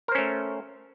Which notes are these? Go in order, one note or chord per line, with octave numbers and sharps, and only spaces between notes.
A3 C#4 A#4 C5